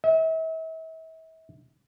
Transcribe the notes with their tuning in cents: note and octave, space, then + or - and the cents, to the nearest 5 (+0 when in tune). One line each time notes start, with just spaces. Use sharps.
E5 -40